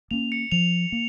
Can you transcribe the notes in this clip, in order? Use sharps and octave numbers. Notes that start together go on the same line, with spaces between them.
A#3 C#4 F7
C#7
F3 F7
A#3